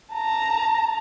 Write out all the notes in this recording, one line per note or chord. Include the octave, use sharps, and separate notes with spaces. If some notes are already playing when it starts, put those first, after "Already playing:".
A5 A#5